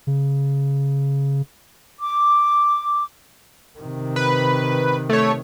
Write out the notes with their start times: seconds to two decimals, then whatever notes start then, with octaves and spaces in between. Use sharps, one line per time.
0.07 C#3
2.00 D6
3.79 C3 D#3
4.16 B4
5.09 A3 C#5